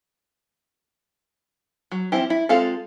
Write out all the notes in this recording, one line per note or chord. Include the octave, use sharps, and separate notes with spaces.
F#3
F3 C4 E4 G4
E4
G#3 C4 F4 A4 F5